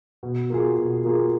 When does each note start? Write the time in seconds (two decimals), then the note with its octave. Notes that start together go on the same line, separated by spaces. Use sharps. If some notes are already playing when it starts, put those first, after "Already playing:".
0.23 B2
0.50 A#3 F4 G#4
0.78 B2
1.05 A#3 F4 G#4